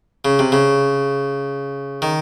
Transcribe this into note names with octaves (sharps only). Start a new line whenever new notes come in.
C#3
C3
C#3
D#3